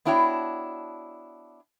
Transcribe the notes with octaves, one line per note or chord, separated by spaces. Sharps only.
B3 D4 E4 F#4 C#5 G5